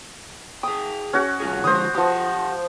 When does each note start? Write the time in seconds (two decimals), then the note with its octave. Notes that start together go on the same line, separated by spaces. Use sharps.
0.63 G#4 G5 D#6
1.13 C#4 F#4
1.40 G2 F4 G#4
1.64 D3 F3 G#3 C5 D#6
1.94 F3 G4 F#5 D#6